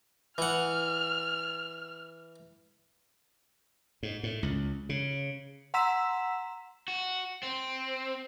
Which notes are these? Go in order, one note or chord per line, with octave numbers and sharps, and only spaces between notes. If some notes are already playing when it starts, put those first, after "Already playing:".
E3 F#5 F6
G#2
A2
C#2
C#3
F#5 A#5 C6 E6 B6 E7
F#4
C4